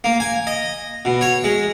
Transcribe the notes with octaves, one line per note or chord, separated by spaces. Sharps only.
A#3
G#5
D#5
B2
C#5
G#3